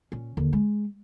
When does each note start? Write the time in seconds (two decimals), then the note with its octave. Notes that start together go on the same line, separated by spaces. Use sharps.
0.12 A#2 C#4
0.37 D#2 D3
0.53 G#3